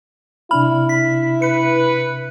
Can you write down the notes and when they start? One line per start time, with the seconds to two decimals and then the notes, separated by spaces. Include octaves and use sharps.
0.51 C3 D4 E4 B5 F6
0.89 B6
1.42 B4 C#7